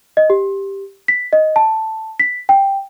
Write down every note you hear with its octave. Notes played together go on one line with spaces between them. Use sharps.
D#5
G4
B6
D#5
A5
B6
G5